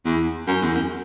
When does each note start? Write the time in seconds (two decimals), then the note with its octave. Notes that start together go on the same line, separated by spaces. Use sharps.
0.05 E2
0.47 F#2
0.62 E2
0.75 F#2